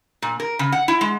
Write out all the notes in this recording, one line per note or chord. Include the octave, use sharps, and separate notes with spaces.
A#2
A#4
C#3
F#5
E4
G#3